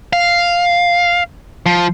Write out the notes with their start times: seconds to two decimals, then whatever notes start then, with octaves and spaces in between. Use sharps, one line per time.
0.13 F5
1.66 F3